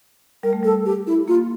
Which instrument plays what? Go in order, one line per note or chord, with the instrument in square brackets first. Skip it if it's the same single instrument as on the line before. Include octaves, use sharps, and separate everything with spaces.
[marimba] G3 [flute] A#4
[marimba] A3
[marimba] G3 [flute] A4
[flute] G4
E4
[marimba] A#3 [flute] F4